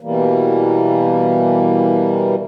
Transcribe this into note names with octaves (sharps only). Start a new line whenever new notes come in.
B2 E3 G3 A#3